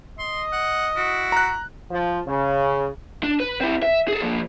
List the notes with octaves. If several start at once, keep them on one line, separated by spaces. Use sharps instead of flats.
D#5 C6
F#5
E4 F#4
A#5 F#6
F3
C#3
D4
B4
C4 E4
E5
G#4 A4
F3 A#3